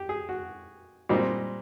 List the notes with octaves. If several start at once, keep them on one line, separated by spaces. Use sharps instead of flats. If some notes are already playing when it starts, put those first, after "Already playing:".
Already playing: G4
G#4
F#4
A#2 G3 C4 D#4